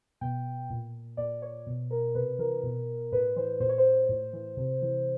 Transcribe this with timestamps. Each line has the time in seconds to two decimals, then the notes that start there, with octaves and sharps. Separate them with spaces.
0.21 B2 G5
0.70 A#2
1.17 A#2 D5
1.42 C#5
1.67 B2
1.91 A#4
2.15 C3 B4
2.39 E3 A#4
2.63 B2
3.12 A2 B4
3.36 E3 C5
3.60 A#2 C5
3.69 C#5
3.78 C5
4.09 A2
4.33 E3
4.57 C3
4.82 E3